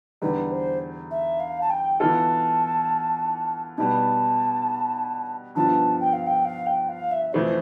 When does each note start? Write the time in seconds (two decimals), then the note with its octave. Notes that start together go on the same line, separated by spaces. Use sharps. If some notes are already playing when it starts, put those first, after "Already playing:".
0.22 E2 D3 G3 B4
0.51 C5
1.11 E5
1.40 F5
1.61 A5
1.70 G5
2.00 E3 B3 F4 A4 A5
3.78 B2 G3 B3 A5
5.55 G2 F3 B3 D4 F4 A5
6.00 G5
6.13 F5
6.27 G5
6.45 F5
6.66 G5
6.89 F5
7.12 E5
7.33 F2 E3 A3 C5